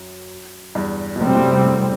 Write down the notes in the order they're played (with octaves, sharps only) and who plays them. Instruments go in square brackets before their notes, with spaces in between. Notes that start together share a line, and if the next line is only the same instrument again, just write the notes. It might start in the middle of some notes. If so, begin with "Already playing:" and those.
Already playing: [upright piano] F#2
E2 G2
B2
[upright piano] F#2 A2 [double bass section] C3 G3 C4
[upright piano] F#2 A2
E2 G2
F#2 A2